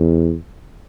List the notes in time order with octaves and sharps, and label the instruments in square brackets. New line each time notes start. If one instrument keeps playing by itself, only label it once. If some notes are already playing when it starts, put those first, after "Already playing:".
Already playing: [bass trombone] E2